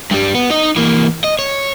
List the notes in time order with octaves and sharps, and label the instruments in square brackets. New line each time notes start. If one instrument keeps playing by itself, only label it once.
[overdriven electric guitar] G2 G3
B3
D#4 D#5
E3 A#3
D#5
C#5